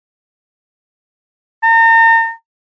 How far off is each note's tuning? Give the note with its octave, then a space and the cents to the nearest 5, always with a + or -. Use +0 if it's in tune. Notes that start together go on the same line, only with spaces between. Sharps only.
A#5 -40